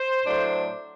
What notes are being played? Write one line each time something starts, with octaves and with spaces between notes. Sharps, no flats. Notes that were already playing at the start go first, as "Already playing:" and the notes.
Already playing: C5
A2 F#3 A3 D4